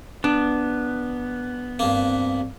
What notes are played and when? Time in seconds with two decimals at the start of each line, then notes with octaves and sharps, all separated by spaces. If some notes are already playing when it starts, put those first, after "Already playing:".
0.24 B3 D4
1.79 G2 A#3 C4